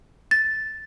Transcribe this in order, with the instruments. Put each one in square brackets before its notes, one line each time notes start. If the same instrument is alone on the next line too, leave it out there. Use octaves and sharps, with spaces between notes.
[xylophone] A6